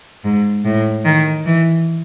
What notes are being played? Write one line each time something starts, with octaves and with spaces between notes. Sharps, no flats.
G#2
A2
D#3
E3